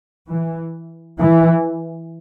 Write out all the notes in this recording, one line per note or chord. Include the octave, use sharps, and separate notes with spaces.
E3
E3